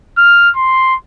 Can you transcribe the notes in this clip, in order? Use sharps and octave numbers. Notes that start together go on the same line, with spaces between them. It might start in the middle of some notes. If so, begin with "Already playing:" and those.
F6
C6